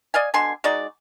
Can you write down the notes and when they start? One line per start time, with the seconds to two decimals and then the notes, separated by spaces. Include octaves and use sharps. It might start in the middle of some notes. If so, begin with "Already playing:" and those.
0.14 D5 D#5 F5 G#5
0.34 B2 D3 G#5 C6
0.64 G#3 D#4 F#4 D5